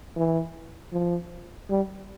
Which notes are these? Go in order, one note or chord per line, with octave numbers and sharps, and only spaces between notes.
E3
F3
G3